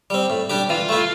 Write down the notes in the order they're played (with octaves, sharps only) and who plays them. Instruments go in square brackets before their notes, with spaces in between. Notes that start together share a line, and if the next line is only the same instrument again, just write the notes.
[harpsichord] G3 C4
A2
G3 D4 G4
[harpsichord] E3 [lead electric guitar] F4
[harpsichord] A3 E4